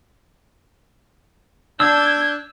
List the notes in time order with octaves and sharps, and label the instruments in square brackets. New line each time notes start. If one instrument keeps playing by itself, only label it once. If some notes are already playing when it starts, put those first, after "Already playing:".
[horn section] D4 [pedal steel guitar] E6 [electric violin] G6 G#6